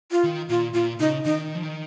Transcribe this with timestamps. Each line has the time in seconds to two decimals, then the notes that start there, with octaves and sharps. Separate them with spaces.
0.11 F4
0.24 D#3
0.49 A#2 F4
0.74 A#2 F4
1.00 C#3 D#4
1.25 D#3 D#4
1.55 F3
1.63 D#3